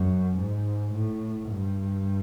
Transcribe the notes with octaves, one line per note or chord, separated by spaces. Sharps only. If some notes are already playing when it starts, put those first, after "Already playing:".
Already playing: F#2
G#2
A2
G2